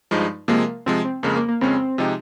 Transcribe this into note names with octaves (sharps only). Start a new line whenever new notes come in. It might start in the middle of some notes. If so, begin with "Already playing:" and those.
G2 F3 G#3 D#4
C3 F3 G#3 A#3
C3 F3 G#3 C4
C4
F2 C#3 G#3 A#3 C#4
A#3
A#3
F2 C#3 G#3 C4 C#4
C3 F3 G#3 D#4 G4